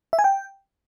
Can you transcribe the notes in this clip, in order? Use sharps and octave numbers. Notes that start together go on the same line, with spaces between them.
E5
G#5
G5